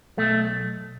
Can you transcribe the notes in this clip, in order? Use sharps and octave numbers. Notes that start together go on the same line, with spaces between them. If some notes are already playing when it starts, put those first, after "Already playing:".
B1 A3